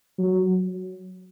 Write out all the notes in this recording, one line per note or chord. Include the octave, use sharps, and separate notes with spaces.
F#3